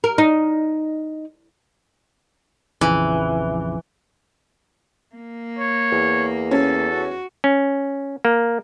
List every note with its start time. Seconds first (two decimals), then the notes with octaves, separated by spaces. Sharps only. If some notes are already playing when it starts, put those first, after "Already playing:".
0.04 A#4
0.18 D#4
2.81 A#1 F2 C#3 E3
5.15 A#3
5.59 C#5
5.92 E2
6.51 C#4 A4
6.91 F#4
7.44 C#4
8.25 A#3